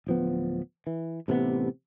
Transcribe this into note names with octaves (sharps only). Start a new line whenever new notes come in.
D1 F3 B3
E3
A1 C3 D#3 B3